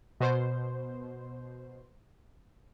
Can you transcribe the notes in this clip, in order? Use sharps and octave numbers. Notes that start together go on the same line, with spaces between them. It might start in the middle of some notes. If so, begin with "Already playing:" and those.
B2 C5